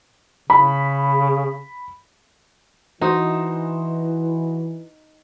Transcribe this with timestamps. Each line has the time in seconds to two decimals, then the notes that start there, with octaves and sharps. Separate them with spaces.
0.50 C#3 B5
3.01 E3 D#4 F#4 C5 D#5